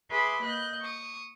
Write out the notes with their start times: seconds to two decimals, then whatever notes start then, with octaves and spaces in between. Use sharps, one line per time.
0.11 G#4 B4 E5 B5 C6 D6
0.43 A#3 D#5 F#6 G6
0.81 C#6 D#6